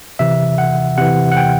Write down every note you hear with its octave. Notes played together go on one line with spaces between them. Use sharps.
C3 E3 E5
F#5
C3 E3 F#5
F#5
G5